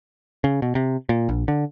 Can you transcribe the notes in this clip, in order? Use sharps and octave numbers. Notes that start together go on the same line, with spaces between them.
C#3
B2
C3
A#2
A#1
D3